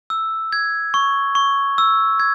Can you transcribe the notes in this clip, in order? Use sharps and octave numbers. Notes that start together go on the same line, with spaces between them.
E6
G#6
C#6
C#6
E6
G#6